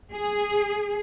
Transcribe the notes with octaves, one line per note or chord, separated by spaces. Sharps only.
G#4